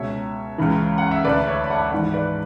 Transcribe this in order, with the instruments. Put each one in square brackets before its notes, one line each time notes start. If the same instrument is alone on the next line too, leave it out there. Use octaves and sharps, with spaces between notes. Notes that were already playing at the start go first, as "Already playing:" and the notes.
Already playing: [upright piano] C#2 B2 C#5 E5
C#2 C#3 E3
F#5
E5
D2 D3 B4 D5
C#5 E5
B5
F#5 A5
G#1 G#2 E3 D5 F#5
B4 D5